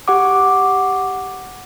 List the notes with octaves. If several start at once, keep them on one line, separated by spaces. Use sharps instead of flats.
G4 F#5 D6